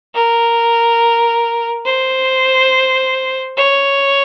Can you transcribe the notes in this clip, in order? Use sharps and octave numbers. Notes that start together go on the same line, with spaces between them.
A#4
C5
C#5